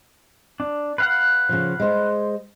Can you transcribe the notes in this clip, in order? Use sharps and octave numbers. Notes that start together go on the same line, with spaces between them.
D4
B4 F5 F#5
C#3 F3
G#3 C5